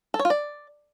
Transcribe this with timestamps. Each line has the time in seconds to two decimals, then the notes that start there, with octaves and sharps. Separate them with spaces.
0.14 A4
0.19 C#5
0.25 F4
0.30 D5